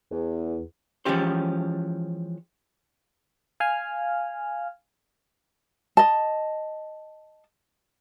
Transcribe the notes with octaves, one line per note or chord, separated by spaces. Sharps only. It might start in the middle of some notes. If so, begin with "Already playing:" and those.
E2
E3 F3 G#3 C#4 G4 C5
F5 G#5 F6
D#5 A5